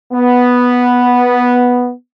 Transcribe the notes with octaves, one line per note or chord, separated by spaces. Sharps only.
B3